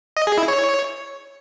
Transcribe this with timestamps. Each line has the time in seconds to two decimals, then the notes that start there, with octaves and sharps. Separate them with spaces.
0.17 D#5
0.27 G#4
0.38 E4
0.48 C#5